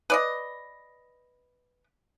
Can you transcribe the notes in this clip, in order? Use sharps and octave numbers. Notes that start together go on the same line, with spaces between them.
B4 D5 D#5